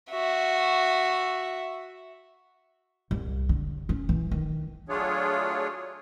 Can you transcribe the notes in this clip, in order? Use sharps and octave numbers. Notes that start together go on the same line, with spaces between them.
F#4 E5
C2
D3
C#4
E3
D#3
F#3 A3 D4 F4 G#4 C#5